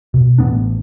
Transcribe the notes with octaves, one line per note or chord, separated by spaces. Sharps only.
B2
A1 F3 B3 D4